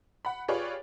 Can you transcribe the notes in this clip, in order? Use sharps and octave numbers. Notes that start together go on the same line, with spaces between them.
F#5 B5
F4 G4 G#4 B4 C#5 D5